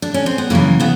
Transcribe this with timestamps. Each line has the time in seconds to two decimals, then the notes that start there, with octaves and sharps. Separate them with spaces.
0.02 D4
0.14 C#4
0.26 C4
0.38 B3
0.50 F#2 C#3 E3 A#3
0.80 C#3 B3